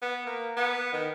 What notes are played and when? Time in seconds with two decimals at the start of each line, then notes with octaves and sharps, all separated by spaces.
0.02 B3
0.26 A#3
0.57 B3
0.93 D#3